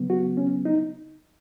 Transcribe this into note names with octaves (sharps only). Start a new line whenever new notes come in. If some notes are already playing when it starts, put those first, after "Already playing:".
Already playing: C#3 F#3 B3
F#4
C#4
D#4